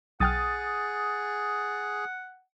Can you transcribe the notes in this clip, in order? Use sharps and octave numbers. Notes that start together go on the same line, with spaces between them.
B1 G#4 F#5 G5 D#6 F6 A6